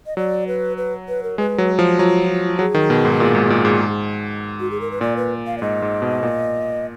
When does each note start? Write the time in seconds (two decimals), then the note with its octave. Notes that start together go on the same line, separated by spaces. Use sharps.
0.06 D#5
0.17 F#3 D5
0.47 B4
0.77 B4
1.08 B4
1.23 A#4
1.38 G#3 B4
1.58 F#3
1.79 F3
1.98 F#3 F4
2.59 F#3 G#4
2.74 D#3
2.90 B2
3.05 G#2
3.20 A#2
3.35 G#2
3.50 A#2
3.65 G#2
4.60 F#4
4.71 G#4
4.81 A#4
4.91 B4
5.01 A#2 D5
5.17 B4
5.47 F5
5.58 D5
5.62 G#2 D#5
5.82 G#2
6.02 B2
6.23 A#2